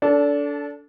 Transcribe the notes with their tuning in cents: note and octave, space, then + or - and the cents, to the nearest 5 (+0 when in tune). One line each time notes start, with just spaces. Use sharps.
D4 -25 A4 +0